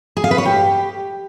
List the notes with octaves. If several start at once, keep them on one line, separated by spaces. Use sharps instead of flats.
G#4
F5
B4
C#5
G4